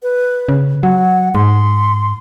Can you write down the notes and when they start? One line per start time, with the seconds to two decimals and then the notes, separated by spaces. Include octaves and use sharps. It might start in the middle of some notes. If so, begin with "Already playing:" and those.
0.03 B4
0.49 C#3
0.83 F#3 F#5
1.35 G#2 C6